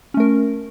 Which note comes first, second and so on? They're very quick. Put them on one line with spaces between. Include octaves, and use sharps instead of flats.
C#4 A3 A#4